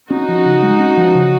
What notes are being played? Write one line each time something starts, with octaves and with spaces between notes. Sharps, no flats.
C#4 D#4 F#4
F3
C#3
G#3
C#4
F3
C#3